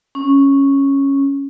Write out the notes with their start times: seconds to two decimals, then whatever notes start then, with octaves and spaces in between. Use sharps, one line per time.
0.15 C#4